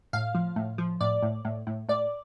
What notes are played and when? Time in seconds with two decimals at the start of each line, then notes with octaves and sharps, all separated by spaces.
0.13 A2 F5
0.35 F3
0.56 A2
0.78 F3
1.01 A2 D5
1.23 A2
1.45 A2
1.67 A2
1.89 A2 D5